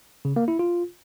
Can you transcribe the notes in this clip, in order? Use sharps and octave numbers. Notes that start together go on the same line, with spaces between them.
C#3
A#3
E4
F4